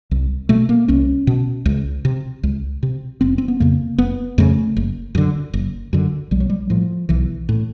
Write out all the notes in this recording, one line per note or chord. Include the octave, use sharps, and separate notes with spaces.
C2
B2 A3
A#3
C2 C#4
B2
C#2
C3
C#2
C3
F1 C4
C4
B3
F2 C#3 A#3
F1 B3
F2 C#3 A3
F#1
F#2 D3
F#1
F#2 D3
B1 G3
F#3
G3
A2 F3
B1 E3
A2